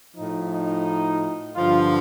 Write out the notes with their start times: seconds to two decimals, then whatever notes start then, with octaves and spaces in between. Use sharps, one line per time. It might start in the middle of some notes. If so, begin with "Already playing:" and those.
0.16 A2 F3 D#4
0.51 D#4
1.55 G2 D3 F3 F4